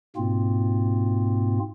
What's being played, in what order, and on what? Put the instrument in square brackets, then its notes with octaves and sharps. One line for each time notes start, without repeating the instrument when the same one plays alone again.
[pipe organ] G#2 B2 A#3 C4 F4